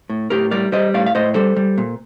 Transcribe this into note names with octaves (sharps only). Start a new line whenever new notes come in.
A2
A2 G4 A#4
G3 A#4 D5
G3 C5 D#5
A2 D5 F5
F5
A2 C5 D#5
G3 A4 C5
G3
A#2